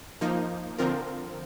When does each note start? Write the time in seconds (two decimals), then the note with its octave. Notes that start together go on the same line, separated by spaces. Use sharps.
0.21 F3 A#3 D#4
0.78 D3 F3 C4 F4 A#4